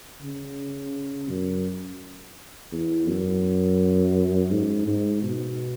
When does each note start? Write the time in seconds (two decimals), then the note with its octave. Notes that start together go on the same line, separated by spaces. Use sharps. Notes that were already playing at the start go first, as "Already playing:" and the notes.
0.22 C#3
1.29 F#2
2.72 E2
3.08 F#2
4.51 G#2
4.87 G#2
5.23 B2